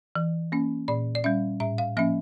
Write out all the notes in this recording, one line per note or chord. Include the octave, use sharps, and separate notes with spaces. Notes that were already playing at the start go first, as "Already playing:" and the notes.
E3
A#3 C#4
A#2 D5
D5
G3 C#4 E5
A2 E5
F5
F3 A#3 C#4 E5